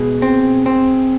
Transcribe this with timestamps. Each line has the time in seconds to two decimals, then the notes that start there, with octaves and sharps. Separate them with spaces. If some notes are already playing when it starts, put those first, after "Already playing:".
Already playing: B2 G#3 G#4
0.22 C4
0.66 C4